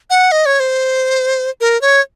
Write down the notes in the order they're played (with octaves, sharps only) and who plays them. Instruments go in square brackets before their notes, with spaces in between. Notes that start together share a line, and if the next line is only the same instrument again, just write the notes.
[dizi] F#5
D#5
C#5
C5
A#4
C#5